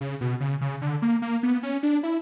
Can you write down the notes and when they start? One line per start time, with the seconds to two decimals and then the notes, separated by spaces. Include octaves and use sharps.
0.01 C#3
0.21 B2
0.40 C#3
0.61 C#3
0.82 D3
1.02 A#3
1.22 A#3
1.43 B3
1.63 C#4
1.83 D4
2.03 E4